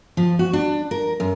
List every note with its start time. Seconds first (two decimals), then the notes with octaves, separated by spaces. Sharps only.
0.17 F3
0.39 F#4
0.53 D4
0.91 A#4
1.20 F#2